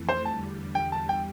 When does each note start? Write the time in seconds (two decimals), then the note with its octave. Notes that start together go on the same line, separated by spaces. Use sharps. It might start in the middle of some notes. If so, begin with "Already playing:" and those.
Already playing: F2 E3 A3
0.09 C5
0.25 E2 D3 G3 A5
0.75 G5
0.92 A5
1.09 G5